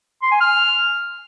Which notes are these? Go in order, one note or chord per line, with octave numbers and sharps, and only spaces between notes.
C6
G#5
F6